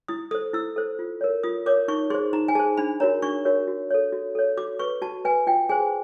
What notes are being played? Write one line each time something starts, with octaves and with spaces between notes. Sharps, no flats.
E4 D#6
A4 C5 D#6
E4 E6
A4 C5
F4
A#4 C#5
F4 D#6
A#4 C#5 D6
D#4 C#6
G#4 C5 C6
D#4 A#5
G#5
G#4 C5 A5
D4 B5
F#4 A#4 C#5 A#5
D4 C#6
F#4 A#4 C#5
F#4
A4 C#5
F#4
A4 C#5
F#4 D6
B4 C#6
F#4 A5
B4 G#5
F4 G5
G#4 C5 G#5